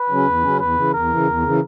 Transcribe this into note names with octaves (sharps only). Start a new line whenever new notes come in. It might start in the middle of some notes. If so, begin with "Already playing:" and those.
Already playing: B4
C#3 F#3 C#4
E2
C#3 F#3 C#4
E2 B4
C#3 E3
E2 A#4
C#3 E3
E2
C#3 E3